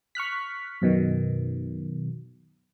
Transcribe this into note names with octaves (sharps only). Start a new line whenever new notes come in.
C#6 F6 F#6 B6
F#2 B2 D#3